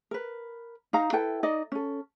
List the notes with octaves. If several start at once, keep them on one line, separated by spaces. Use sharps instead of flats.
A#4 B4
D#4 F5 A#5
E4 A4 B4 G5
D#4 D5 D#5
C#4 A4